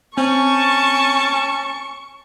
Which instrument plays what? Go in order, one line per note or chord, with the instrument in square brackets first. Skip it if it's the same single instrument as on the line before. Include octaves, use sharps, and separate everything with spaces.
[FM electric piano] C4 [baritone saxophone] C#4 [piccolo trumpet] A5 [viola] C#6